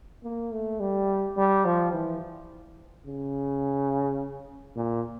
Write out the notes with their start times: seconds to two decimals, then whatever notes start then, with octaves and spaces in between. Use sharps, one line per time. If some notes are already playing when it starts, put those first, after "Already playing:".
0.23 A#3
0.52 A3
0.80 G3
1.37 G3
1.65 F3
1.93 E3
3.06 C#3
4.76 A#2